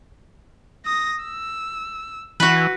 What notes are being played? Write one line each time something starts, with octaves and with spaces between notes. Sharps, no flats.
D#6 A#6
E6
E3 F#4 B4